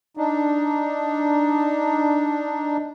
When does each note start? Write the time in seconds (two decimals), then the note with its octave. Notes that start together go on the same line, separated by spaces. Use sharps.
0.17 D4 D#4